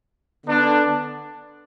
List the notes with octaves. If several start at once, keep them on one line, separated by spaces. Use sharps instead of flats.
D3 B3 D4